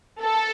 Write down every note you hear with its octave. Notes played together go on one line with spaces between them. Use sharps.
A4